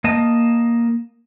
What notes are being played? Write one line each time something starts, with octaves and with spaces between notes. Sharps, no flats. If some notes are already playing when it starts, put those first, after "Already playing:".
A#3 D#5 A5